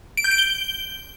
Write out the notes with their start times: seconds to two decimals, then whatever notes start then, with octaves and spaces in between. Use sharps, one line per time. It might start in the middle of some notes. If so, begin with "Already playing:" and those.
0.17 D7
0.24 G6
0.31 D7
0.38 G7